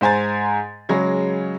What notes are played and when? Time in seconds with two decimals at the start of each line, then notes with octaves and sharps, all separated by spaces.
0.01 G#2 C5 G#5 A#5 A6
0.89 C#3 F#3 G#3